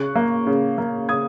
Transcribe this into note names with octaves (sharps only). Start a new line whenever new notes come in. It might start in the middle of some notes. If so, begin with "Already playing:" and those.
Already playing: C#3 C#6 F#6
A#3
C#3
A#3
C#3 D#6 G#6